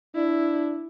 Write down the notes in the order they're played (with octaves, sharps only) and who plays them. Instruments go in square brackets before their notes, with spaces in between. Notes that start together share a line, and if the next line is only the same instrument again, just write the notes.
[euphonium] D4 [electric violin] E4